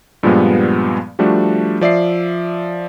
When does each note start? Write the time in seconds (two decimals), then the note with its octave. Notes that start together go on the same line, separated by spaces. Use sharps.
0.23 G2 A#2 F3 G3 G#3 B3
1.19 F3 G3 A3 D4 F#4
1.81 F3 D5 E5 C7